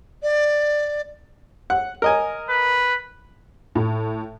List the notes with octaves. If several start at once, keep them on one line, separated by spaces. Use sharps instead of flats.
D5
F#5
A#4 D#5 G#5
B4
A2